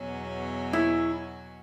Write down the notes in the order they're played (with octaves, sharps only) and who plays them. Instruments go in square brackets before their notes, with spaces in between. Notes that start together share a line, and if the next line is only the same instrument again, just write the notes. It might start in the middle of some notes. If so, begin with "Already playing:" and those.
Already playing: [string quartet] E2 B2 F#3 C#4 F#4
[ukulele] E4